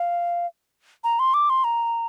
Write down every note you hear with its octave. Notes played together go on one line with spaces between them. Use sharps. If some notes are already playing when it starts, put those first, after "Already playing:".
Already playing: F5
A#5
C6
D6
C6
A#5